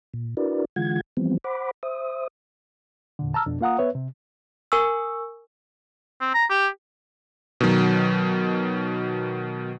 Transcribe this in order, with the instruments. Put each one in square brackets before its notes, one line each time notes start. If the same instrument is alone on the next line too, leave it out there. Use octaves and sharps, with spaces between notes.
[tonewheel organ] A#2
D4 E4 F#4 A#4 B4 D5
D3 E3 G#3 F4 F#5 G#6
E3 F3 G3 B3 C4
C5 F#5 B5 D6
C5 E5 D#6
[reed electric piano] E2 A#2 D3
A5 A#5 E6 F6
F2 B2 D4
A#3 F4 F5 F#5 A#5 D#6
B3 B4 C#5 E5
C3
[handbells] A#4 G#5 C#6 E6
[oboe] C4
A#5
G4
[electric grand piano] B2 D#3 F#3